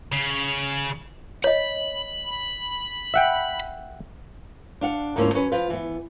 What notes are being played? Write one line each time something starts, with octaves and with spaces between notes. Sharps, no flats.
C#3
C#5 D#5 B5
E5 F#5 G5
D4 F5 F#5
D2 G#2 F3 A#3 C#4 E4
F#3 C#4 B4
F3 F4 B4
E3 B3